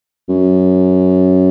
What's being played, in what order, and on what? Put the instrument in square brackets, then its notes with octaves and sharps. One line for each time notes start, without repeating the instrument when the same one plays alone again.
[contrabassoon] F#2